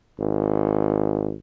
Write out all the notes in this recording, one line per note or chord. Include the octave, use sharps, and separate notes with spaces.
G#1